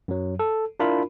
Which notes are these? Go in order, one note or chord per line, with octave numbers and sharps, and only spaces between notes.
F#2 F#3
A4
D4 E4 F4 A#4 B5